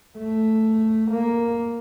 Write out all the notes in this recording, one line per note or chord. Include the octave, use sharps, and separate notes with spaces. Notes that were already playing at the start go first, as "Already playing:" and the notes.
A3
A#3